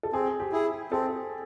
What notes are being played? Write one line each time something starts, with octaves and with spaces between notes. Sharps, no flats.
A4
C4 G#4
G4
E4 G#4
C4 A4